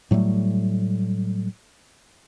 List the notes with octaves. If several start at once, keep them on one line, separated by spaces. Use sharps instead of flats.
A2 F#3 G3 A3